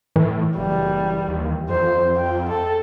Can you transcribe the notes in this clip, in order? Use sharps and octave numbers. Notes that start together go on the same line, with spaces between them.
A2 E3
F#1 G3
D#2
F2 C5
G5
A4